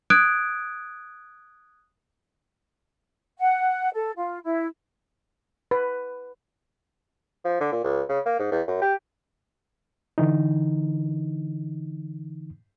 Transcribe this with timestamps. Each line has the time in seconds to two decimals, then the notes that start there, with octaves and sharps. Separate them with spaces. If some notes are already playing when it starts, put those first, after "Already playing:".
0.10 D#6 F#6 G#6 D7
3.39 F#5
3.94 A4
4.16 F4
4.44 E4
5.71 B4
7.45 F3
7.61 D3
7.72 A#2
7.84 C#2
8.09 C#3
8.26 A#3
8.39 G#2
8.52 E2
8.67 F#2
8.82 G4
10.18 D3 E3 D#4